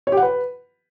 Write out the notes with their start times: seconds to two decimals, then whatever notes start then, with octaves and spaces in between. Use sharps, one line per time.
0.07 C#5
0.12 G4
0.17 F#5
0.22 B4